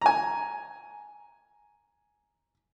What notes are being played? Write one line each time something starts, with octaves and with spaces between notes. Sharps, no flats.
G#5 A#5